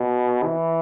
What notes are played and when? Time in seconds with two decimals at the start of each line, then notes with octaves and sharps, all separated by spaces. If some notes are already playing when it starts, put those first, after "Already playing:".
Already playing: B2
0.43 E3